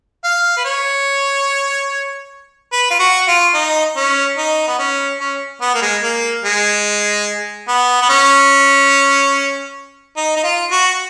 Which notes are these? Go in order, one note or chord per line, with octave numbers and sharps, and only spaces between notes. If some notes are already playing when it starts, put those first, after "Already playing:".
F5
B4
C#5
B4
F4
F#4
F4
D#4
C#4
D#4
B3
C#4
C#4
B3
A#3
G#3
A#3
G#3
B3
B3
C#4
D#4
D#4
F4
F#4